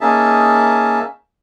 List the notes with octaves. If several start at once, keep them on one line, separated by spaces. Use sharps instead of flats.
A#3 C#4 D#4 G#4 E5 A5